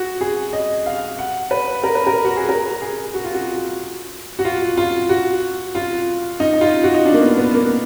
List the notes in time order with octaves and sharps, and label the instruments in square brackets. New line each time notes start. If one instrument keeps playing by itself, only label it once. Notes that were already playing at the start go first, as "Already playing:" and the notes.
Already playing: [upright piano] F#4
G#4
D#5
F5
F#5
B4
A#4
B4
A#4
F#4
G#4
A#4
G#4
F#4
F4
F#4
F#4
F4
F4
F#4
F4
D#4
D#4
F4
F#4
D#4
D4
A#3
B3
B3
A#3